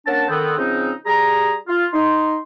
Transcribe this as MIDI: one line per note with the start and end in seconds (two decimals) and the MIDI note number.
0.06 0.27 58
0.06 0.27 61
0.06 0.27 62
0.06 0.27 78
0.06 0.27 81
0.29 0.53 50
0.29 0.53 51
0.29 0.53 59
0.29 0.53 60
0.57 0.91 49
0.57 0.91 53
0.57 0.91 60
0.57 0.91 61
0.57 0.91 63
1.06 1.55 55
1.06 1.55 68
1.06 1.55 82
1.67 1.85 65
1.93 2.35 63
1.93 2.35 84